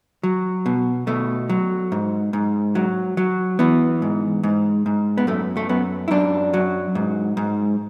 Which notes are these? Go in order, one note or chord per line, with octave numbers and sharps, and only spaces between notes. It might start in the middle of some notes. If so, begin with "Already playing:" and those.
F#3
B2
B2 A3
F#3
G#2
G#2
F#3
F#3
E3 B3
G#2
G#2
G#2
B3
F#2 A3
A3
F#2 B3
E4
F#2 D4
F#3
G#2
G#2